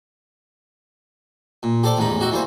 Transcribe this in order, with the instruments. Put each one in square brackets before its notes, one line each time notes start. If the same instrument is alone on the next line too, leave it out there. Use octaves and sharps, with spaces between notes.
[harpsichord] A#2
G4 A4 C5 D5
A1 E2 G#2 D#4 B5
D#4 F#4 G4 E5
E3 G3 A#3 C5